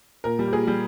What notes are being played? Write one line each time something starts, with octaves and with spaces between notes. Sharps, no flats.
A#2 A#4
G3
G4
A#2 G#4
G3